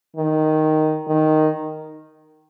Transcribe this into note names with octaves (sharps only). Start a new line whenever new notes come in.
D#3
D#3